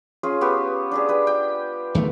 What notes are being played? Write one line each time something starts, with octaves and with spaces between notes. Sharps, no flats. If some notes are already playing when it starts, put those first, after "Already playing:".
C#4 F4 G#4
B3 G4 C#5
D4 G4 G#4
B4 G5
G5
E2 D#3 A3